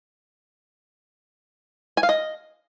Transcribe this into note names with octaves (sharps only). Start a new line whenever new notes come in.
G#5
F5
D#5